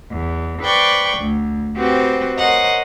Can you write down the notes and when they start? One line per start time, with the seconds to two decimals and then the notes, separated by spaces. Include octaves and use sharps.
0.10 E2
0.62 B4 C5 D5 G5 C#6
1.17 D2
1.76 C4 F#4 G4 B4 C5
2.37 A#4 C5 C#5 D#5 F#5 A#5